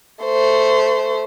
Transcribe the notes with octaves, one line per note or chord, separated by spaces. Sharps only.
A3 C5